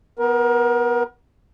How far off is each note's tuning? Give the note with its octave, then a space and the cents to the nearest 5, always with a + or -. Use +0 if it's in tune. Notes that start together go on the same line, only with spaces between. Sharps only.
B3 +0 A#4 +30